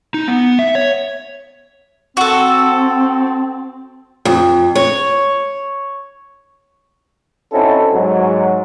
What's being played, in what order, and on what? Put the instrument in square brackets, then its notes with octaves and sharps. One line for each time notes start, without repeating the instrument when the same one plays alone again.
[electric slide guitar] D#4
B3
E5
C#5
[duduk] C4 [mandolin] F#4 A4
[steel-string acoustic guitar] F2
C#5
[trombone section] C4 C#4 D#4 E4 F#4 A4
G#2 F#3